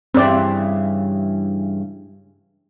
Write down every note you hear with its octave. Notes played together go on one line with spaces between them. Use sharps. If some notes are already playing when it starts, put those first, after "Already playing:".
G2 C#3 E3 C4 D5